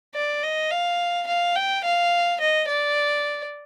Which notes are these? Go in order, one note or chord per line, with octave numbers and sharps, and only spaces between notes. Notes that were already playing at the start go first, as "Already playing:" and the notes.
D5
D#5
F5
F5
G5
F5
D#5
D5